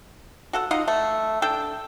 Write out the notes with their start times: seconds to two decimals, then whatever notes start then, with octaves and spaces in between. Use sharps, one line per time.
0.53 F#4 A4 F#5
0.71 D#4 F4 D#5 F#5
0.88 A3
1.42 D4 A4 G5